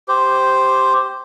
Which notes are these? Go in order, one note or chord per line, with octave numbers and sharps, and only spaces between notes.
G4 C5